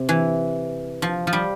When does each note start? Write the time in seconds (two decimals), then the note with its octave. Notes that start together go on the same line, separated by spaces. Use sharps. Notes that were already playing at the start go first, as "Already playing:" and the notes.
Already playing: C3
0.09 E3
1.02 F3
1.27 F3
1.33 G3